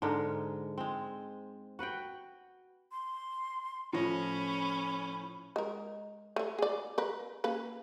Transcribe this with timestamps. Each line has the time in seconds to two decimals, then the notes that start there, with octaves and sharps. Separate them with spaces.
0.02 G#2 D3 G#3 A#4
0.78 G#3 C4
1.79 F#4 B4 F#5 G5
2.92 C6
3.93 A2 F3 C#4 B5 A#6
5.56 G#3 A#4
6.36 A3 E5
6.59 G#4 D5
6.98 A#4 B4
7.44 A#3 C#4 B4